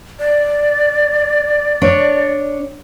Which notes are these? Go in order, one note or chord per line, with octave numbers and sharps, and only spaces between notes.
D5
D4 C#5